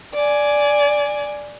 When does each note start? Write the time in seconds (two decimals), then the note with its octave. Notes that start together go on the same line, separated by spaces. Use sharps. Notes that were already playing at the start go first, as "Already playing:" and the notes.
0.14 D5 G#5